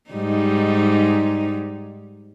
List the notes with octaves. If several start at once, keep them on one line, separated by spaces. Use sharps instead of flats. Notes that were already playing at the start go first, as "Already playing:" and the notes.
G#2 G3 D#4